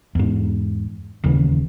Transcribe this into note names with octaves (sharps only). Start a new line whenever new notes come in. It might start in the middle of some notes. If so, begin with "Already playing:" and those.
E2 G#2
D#1 D#2 C#3 E3